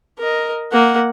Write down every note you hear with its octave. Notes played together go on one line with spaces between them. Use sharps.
A#4 D#5
A#3 F#5